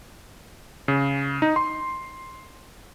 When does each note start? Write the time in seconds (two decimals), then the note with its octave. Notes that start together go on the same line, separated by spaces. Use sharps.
0.88 C#3
1.42 D#4
1.56 C6